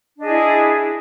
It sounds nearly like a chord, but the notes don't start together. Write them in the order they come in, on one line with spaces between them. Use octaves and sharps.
D4 D#5 G#4 E4